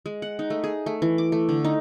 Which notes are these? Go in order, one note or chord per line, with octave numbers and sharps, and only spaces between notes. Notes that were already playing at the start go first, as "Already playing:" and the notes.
G#3
F#5
D#4
A3
G#4
A3
E3
D6
A3
D3
D#4